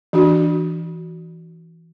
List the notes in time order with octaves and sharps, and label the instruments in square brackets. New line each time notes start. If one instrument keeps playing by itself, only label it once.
[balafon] E3 D4 F#4